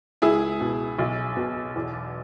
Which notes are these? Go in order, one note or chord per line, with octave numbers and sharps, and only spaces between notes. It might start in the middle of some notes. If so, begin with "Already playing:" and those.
C#2 E4 G#4
B2
B1
B2
E2